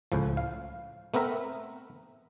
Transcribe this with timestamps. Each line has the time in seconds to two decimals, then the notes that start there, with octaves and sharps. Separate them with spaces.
0.12 C#2 A2 F3
0.37 F5
1.14 A3 B3 C4 A#4 E5